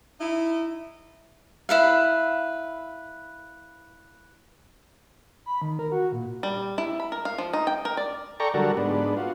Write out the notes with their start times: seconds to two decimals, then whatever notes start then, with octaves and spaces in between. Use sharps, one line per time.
0.20 D#4 E4
1.69 E4 B4 F5
5.46 B5
5.62 D#3
5.79 A#4
5.92 F#4
6.12 A#2
6.43 G3
6.78 E4
7.00 B5
7.12 A#4
7.25 F5
7.38 F3
7.53 D#4
7.67 G5
7.85 A#4
7.97 D5
8.40 A4 D5 G5 A#5 C#6
8.54 D3 F#3 G3 F#4 A4 A#4
8.77 G#2 B3 D4
9.17 F4 F#4